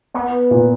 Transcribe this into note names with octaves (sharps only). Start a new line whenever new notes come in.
B3
A#2